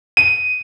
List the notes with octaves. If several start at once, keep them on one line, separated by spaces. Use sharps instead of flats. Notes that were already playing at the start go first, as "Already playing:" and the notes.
D#7